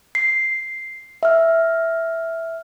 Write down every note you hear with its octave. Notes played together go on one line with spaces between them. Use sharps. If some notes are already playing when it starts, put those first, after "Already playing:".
C7
E5 F6